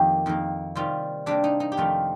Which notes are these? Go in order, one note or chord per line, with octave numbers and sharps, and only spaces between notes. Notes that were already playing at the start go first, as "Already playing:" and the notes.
Already playing: F2 D#3 A#3 G4
F2 D#3 A#3
C3 D#3 G3 F4
C3 G3 A#3 D4
D#4
D#4
G4
F2 C3 D#3 A3 F4